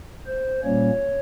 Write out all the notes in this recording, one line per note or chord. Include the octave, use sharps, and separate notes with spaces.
C5
A#2 G3 A#3 C#4 C#5